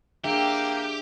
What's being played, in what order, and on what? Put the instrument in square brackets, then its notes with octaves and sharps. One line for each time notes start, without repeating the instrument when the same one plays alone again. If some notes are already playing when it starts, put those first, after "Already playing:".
[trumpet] A#3 [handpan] D4 G#4 E5 [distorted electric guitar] G4 [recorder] G5